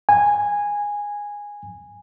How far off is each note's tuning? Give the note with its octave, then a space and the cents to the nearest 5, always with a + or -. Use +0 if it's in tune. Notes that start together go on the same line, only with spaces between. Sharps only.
G#5 -10